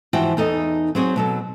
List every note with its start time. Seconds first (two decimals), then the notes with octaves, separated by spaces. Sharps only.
0.13 G#2 E3 F3 F#4 G5
0.37 E2 D#4 A4 D#5
0.95 F#3 C4 G#4 C#5
1.16 B2 F#3 A4